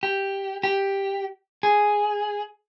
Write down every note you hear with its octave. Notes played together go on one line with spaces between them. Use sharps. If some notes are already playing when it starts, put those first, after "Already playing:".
G4
G4
G#4